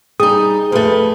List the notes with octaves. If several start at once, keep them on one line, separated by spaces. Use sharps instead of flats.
G3 D#4 G#4 D#6
F2 A3 B4